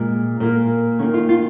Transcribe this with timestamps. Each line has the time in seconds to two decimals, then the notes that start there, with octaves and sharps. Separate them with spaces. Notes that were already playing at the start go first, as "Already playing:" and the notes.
Already playing: A#2 G#3
0.40 A#2 A#3
0.99 D#3 A#3 C#4
1.14 F4
1.29 F4